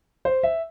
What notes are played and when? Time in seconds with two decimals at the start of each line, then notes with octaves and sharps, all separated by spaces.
0.25 C5
0.43 E5